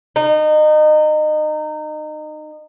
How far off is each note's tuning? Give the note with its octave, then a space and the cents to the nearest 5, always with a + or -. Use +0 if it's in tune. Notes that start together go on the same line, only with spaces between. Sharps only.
D#4 -25